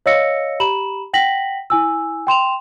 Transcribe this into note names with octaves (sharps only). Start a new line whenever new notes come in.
C#5 D#5 F5 E6 A#6 C#7
G4 A#5 B5 E7 F#7
F#5 G5 A#6 B6 F#7
E4 G#5 E6
G5 C6 E7 F7